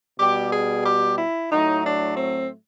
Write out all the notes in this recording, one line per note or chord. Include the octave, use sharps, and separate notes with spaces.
B2 G3 G4
G#4
G4
E4
A2 F#3 A3 D#4
D4
C4